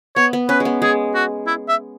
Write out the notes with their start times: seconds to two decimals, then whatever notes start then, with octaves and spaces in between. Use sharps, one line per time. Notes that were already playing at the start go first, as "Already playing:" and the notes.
0.16 B3 C#5
0.33 B3
0.49 C#4 B4
0.60 G#3
0.65 B3
0.82 G#3 G#4
1.15 F#4
1.47 E4
1.69 E5